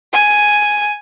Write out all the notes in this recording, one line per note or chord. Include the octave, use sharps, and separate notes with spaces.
G#5